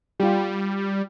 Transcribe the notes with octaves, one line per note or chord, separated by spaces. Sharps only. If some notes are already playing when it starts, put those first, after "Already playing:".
G3 F4 G4